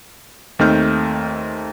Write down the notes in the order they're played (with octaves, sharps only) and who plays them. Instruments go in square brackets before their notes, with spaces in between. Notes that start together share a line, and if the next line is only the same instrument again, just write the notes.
[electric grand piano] D#2 A3 C4 D#4 F6 G6